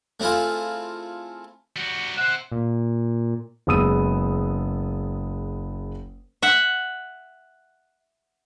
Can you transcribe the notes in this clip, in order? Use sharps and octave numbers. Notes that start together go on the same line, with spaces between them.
A3 C4 E4 F4 G#4
G3 F#4
C5 E5 F#5
A#2
F#1 G#3 B3 D#6 E6 D#7
E5 F#5